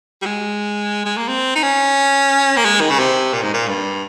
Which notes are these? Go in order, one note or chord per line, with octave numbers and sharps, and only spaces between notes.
G3
G#3
G#3
A#3
C4
D#4
C#4
A#3
G#3
D#3
C#3
C3
A#2
G#2
A#2
G2